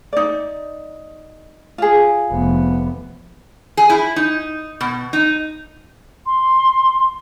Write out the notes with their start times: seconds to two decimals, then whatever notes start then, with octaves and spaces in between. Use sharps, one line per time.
0.13 D#4 D5
1.78 F4 G#4
2.31 F1 B3
3.77 G#4
3.90 E4
4.16 D#4
4.81 B2
5.13 D#4
6.26 C6